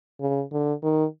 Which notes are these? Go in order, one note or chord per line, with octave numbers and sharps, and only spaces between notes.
C#3
D3
D#3